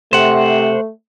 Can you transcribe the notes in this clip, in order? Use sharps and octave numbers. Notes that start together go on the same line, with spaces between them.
C3 A3 C5 F#5